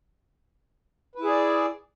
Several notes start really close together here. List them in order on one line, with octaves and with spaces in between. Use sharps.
B4 E4 G#4 D5